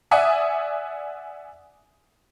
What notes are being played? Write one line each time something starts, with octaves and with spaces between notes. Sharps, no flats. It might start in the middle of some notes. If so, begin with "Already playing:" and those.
D5 E5 F#5 G#5 D#6